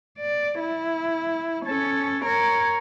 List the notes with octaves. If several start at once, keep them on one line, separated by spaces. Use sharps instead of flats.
D5
E4
C#4 A4
A#4 C#5